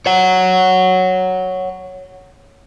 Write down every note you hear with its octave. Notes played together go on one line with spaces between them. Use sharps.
C#5 F#5